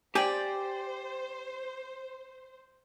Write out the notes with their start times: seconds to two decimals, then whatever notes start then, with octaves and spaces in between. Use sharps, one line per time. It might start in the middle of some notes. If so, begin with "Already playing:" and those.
0.15 G4 C5 D5 G5 G#5